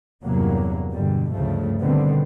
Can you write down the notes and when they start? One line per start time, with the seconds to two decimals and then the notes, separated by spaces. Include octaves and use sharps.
0.25 E2 G2 C3 F#3 A#3
0.92 G2 B2 D3 G3
1.33 D2 G2 C#3 F3 A3
1.81 B2 D3 D#3 G3 B3 C4